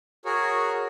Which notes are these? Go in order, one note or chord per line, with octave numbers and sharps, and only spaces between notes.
F#4 G#4 A#4 C#5